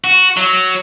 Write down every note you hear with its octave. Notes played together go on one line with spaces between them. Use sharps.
F#4
F#3